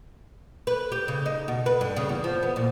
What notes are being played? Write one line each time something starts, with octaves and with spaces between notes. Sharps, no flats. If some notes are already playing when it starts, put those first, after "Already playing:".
B4
G4
C#3
D#4
B2
B4
G2
C#3
E2
F3
B3
A#2